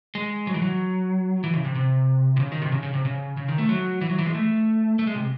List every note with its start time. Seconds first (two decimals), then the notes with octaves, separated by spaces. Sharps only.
0.15 G#3
0.47 F#3
0.54 E3
0.62 F#3
1.44 E3
1.54 C#3
1.64 C3
1.75 C3
2.37 C3
2.40 C#3
2.52 D#3
2.62 C3
2.72 C#3
2.83 C#3
2.94 C3
3.05 C#3
3.37 C#3
3.48 D#3
3.58 A3
3.69 F#3
4.01 E3
4.10 F#3
4.19 E3
4.26 G#3
4.35 A3
4.99 A3
5.07 G#3
5.15 C3